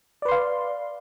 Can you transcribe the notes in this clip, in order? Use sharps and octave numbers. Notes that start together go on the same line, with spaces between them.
B4 D5 F5 C6